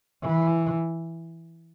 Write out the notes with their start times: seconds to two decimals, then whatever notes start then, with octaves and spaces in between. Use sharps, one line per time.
0.23 E3